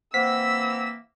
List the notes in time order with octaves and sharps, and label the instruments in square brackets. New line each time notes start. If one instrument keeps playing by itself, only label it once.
[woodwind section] E3 A#3 C4 [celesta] C5 F#5 [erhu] E6 [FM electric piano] B6